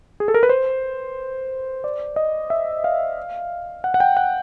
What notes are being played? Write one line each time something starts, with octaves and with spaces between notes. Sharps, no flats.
G#4
A4
A#4
B4
C5
D5
D#5
E5
F5
F#5
F#5
G5
F#5